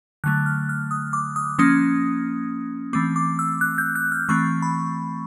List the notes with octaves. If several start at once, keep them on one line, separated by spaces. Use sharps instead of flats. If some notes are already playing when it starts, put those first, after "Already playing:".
D3 F#3 A3 F#6
F6
F6
D#6
D6
D#6
F3 A#3 C#4 D#6
E3 A3 C4 D6
D6
E6
F#6
G6
F#6
F6
E3 A3 C4 C#6
B5